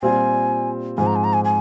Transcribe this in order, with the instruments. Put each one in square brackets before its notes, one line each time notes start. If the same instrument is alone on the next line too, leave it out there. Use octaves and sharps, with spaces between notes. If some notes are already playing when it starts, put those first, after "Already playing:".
[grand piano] A#2 G3 C4 F4 [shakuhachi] G#5
[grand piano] G#2 F3 C4 [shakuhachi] G#5
[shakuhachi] A#5
G#5
A#5
G#5
G#5